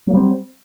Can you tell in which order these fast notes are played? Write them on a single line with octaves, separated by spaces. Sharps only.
F#3 A#3 G3 C4